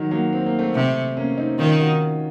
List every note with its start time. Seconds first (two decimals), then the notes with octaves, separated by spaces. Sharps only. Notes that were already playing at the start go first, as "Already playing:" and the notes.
Already playing: D#3 F#3
0.11 F#3 A#3
0.33 C4
0.46 A#3
0.59 A3 C4
0.74 C3
1.17 A#3 C#4
1.37 C4 D#4
1.58 D#3 C#4 F4
1.79 D#4 F#4